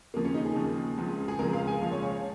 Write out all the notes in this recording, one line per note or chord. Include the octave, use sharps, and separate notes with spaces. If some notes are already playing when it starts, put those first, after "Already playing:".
D#2 C#3 F3 A#3
C#4
D#4
G#4
D#2 C#3 F3
C#2 C#3 F3
G#4
C#2 C#3 F3 A#4
F5
G#5
C#2 C#3 F3 F5
C#5
C#5